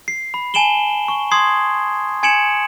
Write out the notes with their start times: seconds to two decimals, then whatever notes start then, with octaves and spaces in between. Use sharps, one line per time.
0.08 C7
0.34 B5
0.54 G#5 A5 D7 E7 F#7 G7
1.08 C#6
1.31 C6 D#6 G#6 C7
2.23 G#5 G#6 C#7 D7 E7 F#7